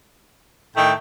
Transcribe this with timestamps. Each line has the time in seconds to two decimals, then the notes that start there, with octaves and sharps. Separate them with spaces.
0.77 A2 D#3 A3 G5